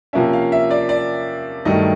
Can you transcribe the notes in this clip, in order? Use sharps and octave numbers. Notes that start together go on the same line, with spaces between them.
C3 F3 A#3 C#4 E5
F5
E5
D5
D5
G2 D#3 F#3 A3 D#5